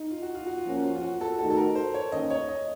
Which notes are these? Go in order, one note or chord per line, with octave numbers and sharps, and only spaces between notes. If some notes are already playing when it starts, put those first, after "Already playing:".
Already playing: D#4
F4
F#4
F4
F#4
F4
F3 A#3 C#4 F#4
F4
F4
F#4
A4
D#3 A3 D#4 F#4 A4
A4
A#4
C5
C#5
D#3 A#3 C#4 D#5
C#5
D#5